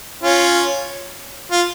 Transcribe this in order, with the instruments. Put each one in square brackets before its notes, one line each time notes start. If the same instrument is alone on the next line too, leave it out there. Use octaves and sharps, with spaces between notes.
[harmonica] C#4 F4
F4